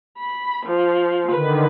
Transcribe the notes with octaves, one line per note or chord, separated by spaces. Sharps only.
B5
F3
D3 D#3 B4